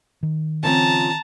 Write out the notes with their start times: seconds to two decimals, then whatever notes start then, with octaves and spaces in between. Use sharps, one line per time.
0.23 D#3
0.63 C#3 F3 C4 A5 A#5